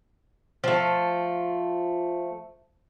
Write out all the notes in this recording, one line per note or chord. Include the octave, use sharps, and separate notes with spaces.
F3 A3